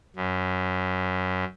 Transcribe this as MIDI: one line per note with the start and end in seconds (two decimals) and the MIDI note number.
0.16 1.44 42